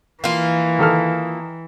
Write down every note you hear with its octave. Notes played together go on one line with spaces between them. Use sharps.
E3 A#3 F4
D#3 A4 F6